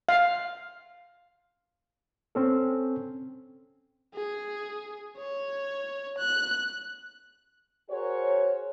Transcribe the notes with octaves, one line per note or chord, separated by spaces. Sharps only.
F5
C4 C#4 A4
G#4
C#5
F#6
F#4 G#4 A#4 C5 C#5